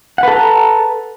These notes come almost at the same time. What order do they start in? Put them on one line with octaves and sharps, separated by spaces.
F#5 B4 A4 A#5